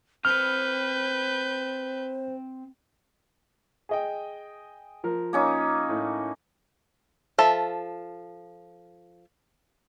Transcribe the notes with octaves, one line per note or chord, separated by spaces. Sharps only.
C4 B4 C5 B5 F6 G6
G#4 D#5 G5
F3 A#4
A#3 C#4 D#4
A2
F3 A4 E5